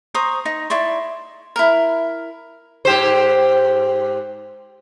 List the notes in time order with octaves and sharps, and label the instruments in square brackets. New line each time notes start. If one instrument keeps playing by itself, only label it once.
[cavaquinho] C5 A#5 C#6 D#6
D#4
E4 D5 C6 C#6
E4 A#4
[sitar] G#2 G4 C5